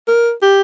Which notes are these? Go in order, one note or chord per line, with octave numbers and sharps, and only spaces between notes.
A#4
G4